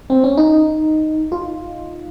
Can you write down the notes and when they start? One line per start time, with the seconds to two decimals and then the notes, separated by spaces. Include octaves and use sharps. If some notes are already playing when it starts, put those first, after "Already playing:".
0.10 C4
0.24 C#4
0.37 D#4
1.32 F4